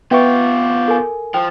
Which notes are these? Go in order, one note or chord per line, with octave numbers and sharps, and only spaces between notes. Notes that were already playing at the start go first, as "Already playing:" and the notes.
B3 F4 G4 B4 E5 G5 C#6
A4 A#4 G#5
F3 G5